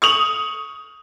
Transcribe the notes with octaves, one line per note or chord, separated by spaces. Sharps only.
C#6 D#6 F7 F#7